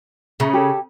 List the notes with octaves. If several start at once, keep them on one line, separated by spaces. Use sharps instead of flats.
C#3 E5 A#5
G4 A4 C#5